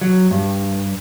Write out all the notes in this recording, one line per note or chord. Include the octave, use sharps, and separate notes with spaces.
F#3
G2